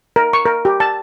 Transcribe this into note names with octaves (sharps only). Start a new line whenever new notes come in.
A#4
C#6
A#4
G4
A5